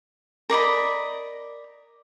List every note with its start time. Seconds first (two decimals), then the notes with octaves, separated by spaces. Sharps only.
0.50 A#4 D5 D#5 B5